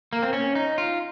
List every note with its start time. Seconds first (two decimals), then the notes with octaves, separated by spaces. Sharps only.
0.13 A#3
0.23 C4
0.33 C#4
0.55 D#4
0.78 F4